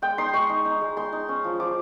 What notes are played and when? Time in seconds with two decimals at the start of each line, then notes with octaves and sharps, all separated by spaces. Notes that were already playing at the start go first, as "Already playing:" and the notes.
0.02 G#3 G5
0.18 D#4 C6
0.33 G#3 C#6
0.49 D#4
0.65 D#4
0.81 G#3
0.96 G#3 C6
1.13 D#4
1.28 C#4
1.44 F3
1.60 F3 D6